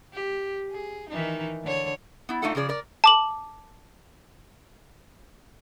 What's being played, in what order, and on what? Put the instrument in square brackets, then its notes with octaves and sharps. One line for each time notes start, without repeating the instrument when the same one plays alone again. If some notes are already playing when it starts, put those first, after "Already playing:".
[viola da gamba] G4
G#4
D#3 E3 D#4
D3 C#5
[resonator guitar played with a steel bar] B3 E4
A3 D4 D#4 F4 A4 F#5
C#3 F3 G#4 D5
A#4 D5
[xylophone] A5 D6 F#7